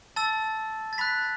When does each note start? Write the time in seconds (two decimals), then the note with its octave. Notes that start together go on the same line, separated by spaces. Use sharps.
0.16 A5 E6 A6
0.93 A6
0.98 B5 F#6 B6